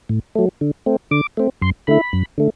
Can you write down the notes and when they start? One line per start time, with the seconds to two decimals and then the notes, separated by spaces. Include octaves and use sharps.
0.09 A2
0.35 F#3 A3
0.61 D3
0.86 A3 C4
1.11 D3 D6
1.37 A3 C4
1.62 F#2 C6
1.87 D3 A3 E4 B5
2.13 F#2
2.38 D3 A3